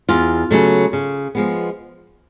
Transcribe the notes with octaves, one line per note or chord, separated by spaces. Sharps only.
E2 F4
C#3 F#3 A3
C#3
F3 G#3 B3